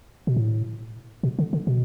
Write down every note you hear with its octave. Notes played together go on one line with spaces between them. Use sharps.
B2
A2
B2
D3
D3
B2